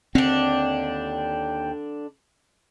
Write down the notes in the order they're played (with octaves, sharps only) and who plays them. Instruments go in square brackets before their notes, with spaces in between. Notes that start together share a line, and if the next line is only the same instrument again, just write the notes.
[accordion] D#2 G5 [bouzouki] D3 D4 [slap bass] C4